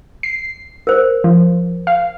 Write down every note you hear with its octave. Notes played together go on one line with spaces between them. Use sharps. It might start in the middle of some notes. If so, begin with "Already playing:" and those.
C7
A#4 C5
F3
F5